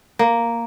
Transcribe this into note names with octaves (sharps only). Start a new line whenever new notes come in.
A#3